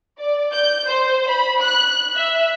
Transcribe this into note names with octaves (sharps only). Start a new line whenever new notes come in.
D5
G6
C5
B5
F#6
E5